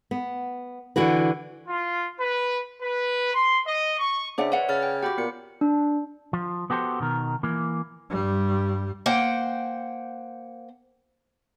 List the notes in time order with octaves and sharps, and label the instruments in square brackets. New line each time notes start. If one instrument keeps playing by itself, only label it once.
[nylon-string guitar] B3
D3 E3 F#4 B4
[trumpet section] F4
B4
B4
C6
D#5
C#6
[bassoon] C#3 [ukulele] D4 D5 F#5 [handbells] C5 E5
[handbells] B4 C#5 [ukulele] D5 F#5
[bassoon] C#3 [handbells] C#5 F6 A6
[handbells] G5
[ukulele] F#4 G4 [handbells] F#5 B5 D6
[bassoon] A#2 [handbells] B3 C#7
[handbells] D4
[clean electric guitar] F3
B3 F#4 G4 A4 C5
B2 D#3 A#4
E3 A#3
[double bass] G2 G3
[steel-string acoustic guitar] A#3 C5 F#5 G5